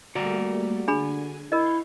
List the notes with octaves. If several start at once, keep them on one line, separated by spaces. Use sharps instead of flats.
G3 A3 A#3 F#4 D5 A#5
D3 D4 G#4 G#5 B5
E4 A#4 D#5 F5 C#6 G6